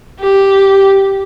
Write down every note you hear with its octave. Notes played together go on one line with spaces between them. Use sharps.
G4